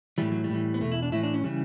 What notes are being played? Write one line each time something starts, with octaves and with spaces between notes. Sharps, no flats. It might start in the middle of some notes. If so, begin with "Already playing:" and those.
A2 E3 G3
F#3
G3
A2 E3
B3
E2 B2 A3
E4
D4
A2 E3 E4
D4
C#4
C#3 E3 G3